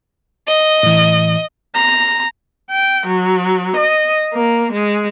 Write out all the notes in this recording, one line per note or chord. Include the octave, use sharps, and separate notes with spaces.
D#5
A2 E3
A#5
G5
F#3
D#5
A#3
G#3